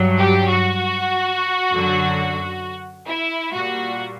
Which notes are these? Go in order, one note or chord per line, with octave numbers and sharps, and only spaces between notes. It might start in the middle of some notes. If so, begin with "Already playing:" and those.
Already playing: G2 F#3
G4
F#4
F#2 D3 F#3
E4
A#2 G3 F#4